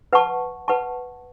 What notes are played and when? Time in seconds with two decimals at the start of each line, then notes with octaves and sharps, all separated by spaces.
0.13 B4 F#5 A5 C#6
0.68 B4 F#5 A5 C#6